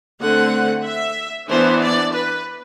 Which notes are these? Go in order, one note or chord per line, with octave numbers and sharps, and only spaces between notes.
D3 A3 C4 F#5
E5
E3 B3 D4 C5
D5
B4